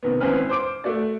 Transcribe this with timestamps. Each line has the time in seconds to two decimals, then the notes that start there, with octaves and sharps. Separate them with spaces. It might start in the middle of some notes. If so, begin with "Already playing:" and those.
0.03 C3 D#3 B3
0.20 G#1 E3 C4 C#4 B4 F6
0.49 C5 D6 D7
0.84 A3 F#4 D5